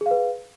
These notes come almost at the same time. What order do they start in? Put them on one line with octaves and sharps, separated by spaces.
G#4 F5 B4